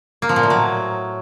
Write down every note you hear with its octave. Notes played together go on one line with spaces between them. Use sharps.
A#3
F3
A#2
A2
F#3